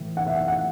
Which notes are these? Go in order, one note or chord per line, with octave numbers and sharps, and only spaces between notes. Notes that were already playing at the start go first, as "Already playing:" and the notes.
Already playing: A2 E3
F#5
E5
F#5
F#5